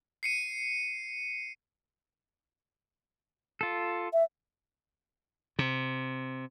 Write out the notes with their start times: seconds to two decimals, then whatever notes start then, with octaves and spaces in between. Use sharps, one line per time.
0.23 C7 C#7 D#7
3.61 F4 A4
4.13 E5
5.59 C3